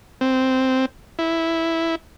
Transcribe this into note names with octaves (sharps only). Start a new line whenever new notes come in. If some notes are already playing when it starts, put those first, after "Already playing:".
C4
E4